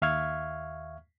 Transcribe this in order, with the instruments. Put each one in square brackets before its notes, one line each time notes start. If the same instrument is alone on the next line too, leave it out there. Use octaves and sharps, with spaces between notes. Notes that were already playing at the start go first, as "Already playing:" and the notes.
[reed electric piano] D#2 E5 F5 C#6 F6 G#6